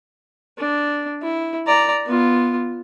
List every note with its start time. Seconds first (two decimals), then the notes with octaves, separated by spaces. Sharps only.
0.58 D4
1.22 E4
1.67 D5 A#5
2.06 B3 F4